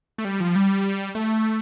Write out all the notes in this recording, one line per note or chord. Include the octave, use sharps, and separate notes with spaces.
A3
G3
F3
G3
A3